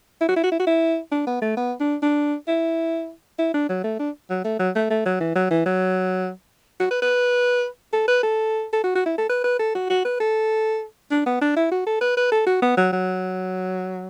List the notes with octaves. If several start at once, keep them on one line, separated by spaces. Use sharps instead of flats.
E4
F#4
E4
F#4
E4
F#4
E4
D4
B3
A3
B3
D4
D4
E4
E4
D4
F#3
A3
D4
F#3
A3
F#3
A3
A3
F#3
E3
F#3
E3
F#3
F#4
B4
B4
A4
B4
A4
A4
F#4
F#4
E4
A4
B4
B4
A4
F#4
F#4
B4
A4
D4
B3
D4
E4
F#4
A4
B4
B4
A4
F#4
B3
F#3
F#3